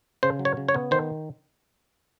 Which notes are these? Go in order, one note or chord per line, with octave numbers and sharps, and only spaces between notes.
C#3 C5
F#3
C#5
C#3
C#5
B3
D#3 C5